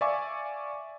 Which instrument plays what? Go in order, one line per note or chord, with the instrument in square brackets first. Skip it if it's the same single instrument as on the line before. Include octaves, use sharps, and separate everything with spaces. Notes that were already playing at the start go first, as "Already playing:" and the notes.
[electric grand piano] D5 E5 F5 G#5 C#6 D6